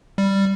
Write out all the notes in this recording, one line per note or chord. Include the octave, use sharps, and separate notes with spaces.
G3